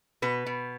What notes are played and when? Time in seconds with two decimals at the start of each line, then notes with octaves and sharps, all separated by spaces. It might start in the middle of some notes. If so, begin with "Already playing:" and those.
0.22 B2 B4
0.46 B2